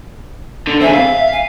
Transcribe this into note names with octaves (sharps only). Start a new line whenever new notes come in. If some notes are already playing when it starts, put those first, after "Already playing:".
D3
C4 G#4 E5
F5
G#5